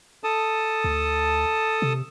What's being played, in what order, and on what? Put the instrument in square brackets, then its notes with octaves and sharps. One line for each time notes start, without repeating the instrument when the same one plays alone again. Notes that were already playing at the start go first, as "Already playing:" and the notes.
[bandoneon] A4 A5 D#6
[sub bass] D2
C3